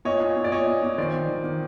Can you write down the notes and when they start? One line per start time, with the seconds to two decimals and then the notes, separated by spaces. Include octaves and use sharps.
0.05 A#2 C#5 D#5
0.20 A#2
0.37 A#2
0.44 D5
0.52 A#2 C#5 D#5
0.67 A#2
0.82 A#2
0.98 D#3 C5 D5
1.13 D#3
1.29 D#3
1.44 D#3